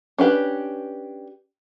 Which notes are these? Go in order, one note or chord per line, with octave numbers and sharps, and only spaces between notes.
C#4 D4 G4 B4